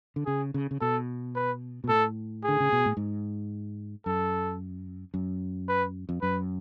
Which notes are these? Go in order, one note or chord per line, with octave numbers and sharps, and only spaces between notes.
D3
C#3 G#4
C#3
C#3
B2 A4
B4
B2
A2 A4
D3 G#4
C#3
B2
A2
G#2
F#2 A4
F#2
B4
F2
F#2 B4